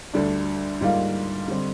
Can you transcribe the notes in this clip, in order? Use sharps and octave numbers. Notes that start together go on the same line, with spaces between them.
D2 D3 G3 D4
G#2 G3 A#3 F4
D3 G3 C4